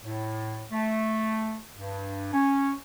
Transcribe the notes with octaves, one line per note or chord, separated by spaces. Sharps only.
A2
A3
G2
C#4